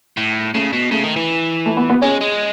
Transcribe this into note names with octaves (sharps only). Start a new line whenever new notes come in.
A2
C#3 A3
B2
C#3 A3
D#3
E3
A3
B3
B3
G#3 C#4
G#3